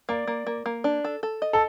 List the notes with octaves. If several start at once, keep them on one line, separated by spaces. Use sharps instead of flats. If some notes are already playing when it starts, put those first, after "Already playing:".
A#3 D5
A#3
A#3
A#3
D4
A4
A4
D#5
A4